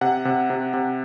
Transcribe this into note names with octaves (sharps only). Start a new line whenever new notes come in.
C3 F#5
C3
C3
C3